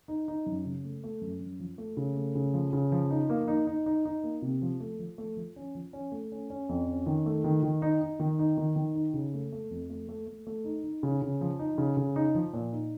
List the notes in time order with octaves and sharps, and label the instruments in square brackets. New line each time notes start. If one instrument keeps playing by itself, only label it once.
[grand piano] D#4
D#4
F#2
C#3
A3
A3
F#2
F#2
F3
A3
C#3
A3
C#3
F3
C#3
F3
D#4
A#3
D#4
D#4
D#4
D#4
A#3
C3
F3
A3
F3
A3
F3
C#4
F3
C#4
A3
C#4
C#4
F2
C#4
D#3
A3
D#3
D#3
D#4
D#4
D#3
D#4
D#3
D#3
D#4
C#3
A3
A3
F2
A3
A3
A3
A3
D#4
D#4
C#3
C#3
F3
D#4
C#3
C#3
D#4
F3
A#2
D#4